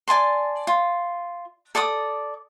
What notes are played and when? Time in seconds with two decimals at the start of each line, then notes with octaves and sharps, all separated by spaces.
0.08 D5 G#5 A5 C6
0.67 F4
1.75 A4 D5 D6 D#6